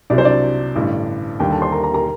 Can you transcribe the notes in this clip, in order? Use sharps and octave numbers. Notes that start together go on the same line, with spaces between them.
C2 C3 F#3 D5
C5
D4 D5
A1 G2 D3
D#2 D3 G3 G4 G5
A4 A5
C5 C6
A#4 A#5
A#4 A#5
A#4 A#5